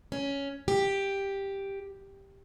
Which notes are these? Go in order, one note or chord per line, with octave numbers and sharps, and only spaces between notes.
C#4
G4